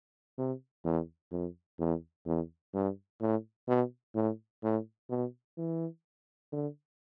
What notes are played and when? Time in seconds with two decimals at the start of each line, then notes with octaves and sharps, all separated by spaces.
0.38 C3
0.85 E2
1.31 F2
1.79 E2
2.26 E2
2.74 G2
3.21 A2
3.68 B2
4.15 A2
4.63 A2
5.10 B2
5.58 E3
6.52 D3